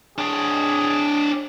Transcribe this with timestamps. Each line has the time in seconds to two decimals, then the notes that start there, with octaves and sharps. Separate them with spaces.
0.18 D4 G#4 C#5